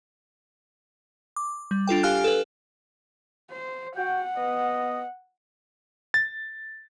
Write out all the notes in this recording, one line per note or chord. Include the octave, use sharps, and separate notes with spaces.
D6
G3
D4 F4 A4 G5
G4 F5 G#5 F6 F#6
A4 B4
C5
F#4 F#5 G5
B3 D#5
A6